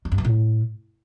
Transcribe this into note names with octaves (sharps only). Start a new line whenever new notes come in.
A3
G2
E3
A2